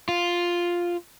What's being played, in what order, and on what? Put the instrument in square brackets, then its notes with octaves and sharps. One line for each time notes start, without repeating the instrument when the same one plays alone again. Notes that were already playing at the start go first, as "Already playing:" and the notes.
[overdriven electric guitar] F4